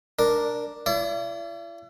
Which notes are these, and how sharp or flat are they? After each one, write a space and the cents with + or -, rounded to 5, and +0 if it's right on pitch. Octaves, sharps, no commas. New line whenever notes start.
D4 +0 A#4 +0
E4 +45 D5 -35